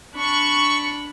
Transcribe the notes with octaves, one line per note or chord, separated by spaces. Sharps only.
D4 B5 C#6